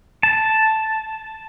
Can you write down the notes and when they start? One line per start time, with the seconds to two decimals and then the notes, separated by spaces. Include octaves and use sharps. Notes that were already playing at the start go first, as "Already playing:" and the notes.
0.23 A5